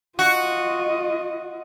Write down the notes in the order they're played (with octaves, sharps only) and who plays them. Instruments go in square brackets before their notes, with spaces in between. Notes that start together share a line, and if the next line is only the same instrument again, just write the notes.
[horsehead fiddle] F4 D#5 [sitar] F#4